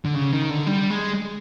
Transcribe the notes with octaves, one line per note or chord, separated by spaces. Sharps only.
D3
C#3
D#3
D3
G3
G#3